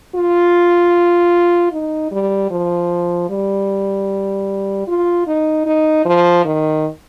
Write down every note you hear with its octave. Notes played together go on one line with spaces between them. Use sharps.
F4
D#4
G3
F3
G3
F4
D#4
D#4
F3
D#3